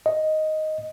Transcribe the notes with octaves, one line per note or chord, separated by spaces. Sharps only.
D#5